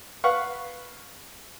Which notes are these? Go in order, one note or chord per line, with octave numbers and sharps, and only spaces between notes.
B4 F5 F#5 C#6